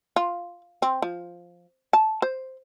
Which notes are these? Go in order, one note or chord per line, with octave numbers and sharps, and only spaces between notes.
F4
C4
F3
A5
C5